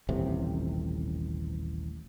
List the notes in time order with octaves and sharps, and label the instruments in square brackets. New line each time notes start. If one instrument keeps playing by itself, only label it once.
[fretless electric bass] D#1 A1 C3